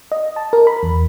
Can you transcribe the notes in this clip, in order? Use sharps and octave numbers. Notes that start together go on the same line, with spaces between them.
D#5
A5
A#4
B5
E2